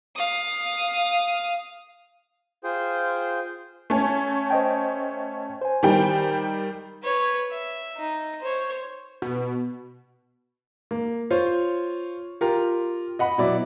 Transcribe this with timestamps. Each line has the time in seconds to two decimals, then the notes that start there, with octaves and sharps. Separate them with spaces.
0.16 F5 D#6
2.64 F4 G#4 C5 G5
3.90 A3 C#4
4.50 C5 D#5 G5
5.62 C5 G#5
5.83 D#3 G3 G5
7.03 B4 C#5
7.52 E5
7.96 D#4
8.41 C5 C#5
9.22 B2
10.91 A#3
11.30 F4 C5 C#5
12.41 F4 G4 A#4
13.19 D#5 F#5 B5
13.38 B2 F#3 E4 D5